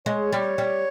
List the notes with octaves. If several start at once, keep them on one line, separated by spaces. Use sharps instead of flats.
G#3 C#5
G3
G3